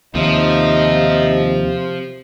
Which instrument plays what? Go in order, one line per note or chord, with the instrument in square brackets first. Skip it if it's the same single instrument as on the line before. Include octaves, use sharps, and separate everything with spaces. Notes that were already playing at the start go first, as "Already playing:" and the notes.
[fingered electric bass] D#2 [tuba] C3 [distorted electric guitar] F3 [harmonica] D#4 E5